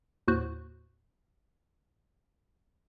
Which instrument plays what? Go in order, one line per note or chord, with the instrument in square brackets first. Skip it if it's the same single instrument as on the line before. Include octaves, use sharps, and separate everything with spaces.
[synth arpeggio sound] D#2 A2 F#4 C5 F#6